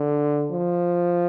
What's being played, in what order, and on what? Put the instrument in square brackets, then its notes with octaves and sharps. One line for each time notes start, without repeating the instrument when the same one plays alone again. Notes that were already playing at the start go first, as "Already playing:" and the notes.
Already playing: [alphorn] D3
F3